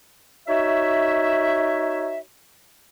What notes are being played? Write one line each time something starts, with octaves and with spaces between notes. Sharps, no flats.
D#4 F#4 C#5 E5